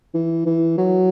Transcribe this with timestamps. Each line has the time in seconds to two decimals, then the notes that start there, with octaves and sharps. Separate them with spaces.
0.14 E3
0.46 E3
0.78 F#3